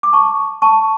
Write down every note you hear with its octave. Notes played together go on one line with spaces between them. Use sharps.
D6
A5 C#6
A5 C#6